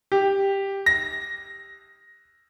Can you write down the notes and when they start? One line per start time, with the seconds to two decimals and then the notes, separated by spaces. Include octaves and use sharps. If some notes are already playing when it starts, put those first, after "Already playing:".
0.12 G4
0.86 A#6